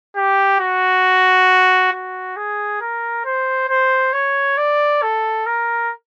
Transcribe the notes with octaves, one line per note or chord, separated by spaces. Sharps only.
G4
F#4
F#4
G#4
A#4
C5
C5
C#5
D5
A4
A#4